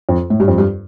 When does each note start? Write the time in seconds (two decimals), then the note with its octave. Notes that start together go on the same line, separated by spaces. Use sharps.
0.09 F2
0.30 A2
0.40 G2
0.48 F2
0.58 G2